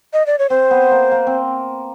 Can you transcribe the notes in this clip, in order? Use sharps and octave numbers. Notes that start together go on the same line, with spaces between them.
D#5
D5
C#5
C4 C5
B3
A#3
A#3
C4